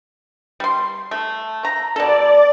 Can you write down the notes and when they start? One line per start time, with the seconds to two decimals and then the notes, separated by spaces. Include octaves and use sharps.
0.60 G3 C6
1.11 A3
1.65 A#5
1.96 B2 A4 D5